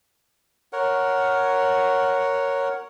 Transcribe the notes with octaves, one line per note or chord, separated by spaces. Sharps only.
A#4 C#5 F#5